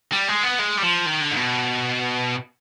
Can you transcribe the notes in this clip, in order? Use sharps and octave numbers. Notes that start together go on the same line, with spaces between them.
G3
G#3
B3
G#3
G3
F3
D#3
D3
G#2
B2